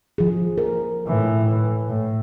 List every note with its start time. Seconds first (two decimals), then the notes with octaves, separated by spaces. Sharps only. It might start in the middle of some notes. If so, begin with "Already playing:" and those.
0.18 F3 G#4
0.58 A#4
1.07 A2 E3
1.89 A2